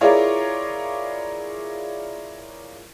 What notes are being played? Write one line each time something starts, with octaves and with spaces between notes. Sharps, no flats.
E4 F4 G#4 A#4 C#5 D5